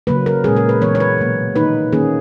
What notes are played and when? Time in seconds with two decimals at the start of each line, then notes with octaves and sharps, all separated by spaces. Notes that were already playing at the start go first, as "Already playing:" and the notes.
0.07 C#3 F#3 A#3 B4
0.26 A#4
0.44 A#2 G#3 C#4 G#4
0.57 A#4
0.69 B4
0.81 E3 G#3 B3 C#5
0.95 C#5
1.00 B4
1.18 B2 F#3 A#3
1.56 D#3 A#3 D#4 B4
1.93 D#3 A#3 C#4 G#4